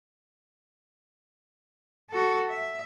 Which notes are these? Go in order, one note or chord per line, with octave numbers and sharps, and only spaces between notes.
F#4 A4
E5